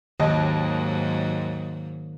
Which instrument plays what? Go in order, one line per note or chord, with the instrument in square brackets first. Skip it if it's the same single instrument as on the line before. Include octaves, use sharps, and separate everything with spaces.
[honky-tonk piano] D#2 [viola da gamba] G#2 F#3 A#3 [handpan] D#3 [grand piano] D#5